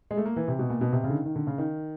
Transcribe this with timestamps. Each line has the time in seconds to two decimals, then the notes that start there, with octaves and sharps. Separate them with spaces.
0.11 G#3
0.17 A3
0.26 A#3
0.36 E3
0.48 C3
0.59 B2
0.70 A#2
0.81 B2
0.92 C3
1.04 C#3
1.10 D3
1.14 D#3
1.26 D#3
1.36 D3
1.47 C#3
1.58 D#3